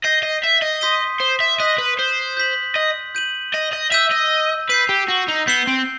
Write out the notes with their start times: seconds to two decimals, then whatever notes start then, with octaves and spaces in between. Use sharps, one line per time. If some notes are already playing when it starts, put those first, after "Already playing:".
0.04 D#5 G6 C7 D#7 G7
0.23 D#5
0.44 E5
0.62 D#5
0.81 C6 D#6 G6 B6 D#7
1.20 C5
1.40 E5
1.60 D#5 D#6 F#6 B6 F#7
1.78 B4
1.99 C5
2.37 G6 B6 F#7
2.75 D#5
3.15 G6 D#7 F#7
3.54 D#5
3.73 D#5
3.92 E5 E6 G6 D#7
4.12 D#5
4.70 B4 G6 C7 D#7
4.89 G4
5.08 F#4
5.28 D#4
5.47 B3 G6 C7 E7 G7
5.67 C4